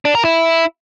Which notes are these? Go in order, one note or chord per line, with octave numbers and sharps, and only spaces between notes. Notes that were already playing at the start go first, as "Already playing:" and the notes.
D4
A#4
E4